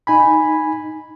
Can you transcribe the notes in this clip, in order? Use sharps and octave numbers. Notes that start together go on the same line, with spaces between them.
D#4 G#5 B5